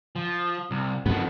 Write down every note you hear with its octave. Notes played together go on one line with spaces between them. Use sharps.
F3
C2
F2 D#3 B3